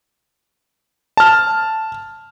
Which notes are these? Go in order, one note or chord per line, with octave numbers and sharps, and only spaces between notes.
A5 F6